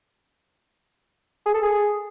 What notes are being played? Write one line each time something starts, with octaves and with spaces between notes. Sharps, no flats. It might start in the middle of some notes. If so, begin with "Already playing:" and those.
G#4
A4
G#4